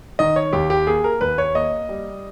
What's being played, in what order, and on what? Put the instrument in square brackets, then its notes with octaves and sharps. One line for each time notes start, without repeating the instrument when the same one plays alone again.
[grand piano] D#3 D#5
C#5
D#2 G4
G4
A#3 G#4
A#4
D#2 B4
C#5
A#3 D#5
G3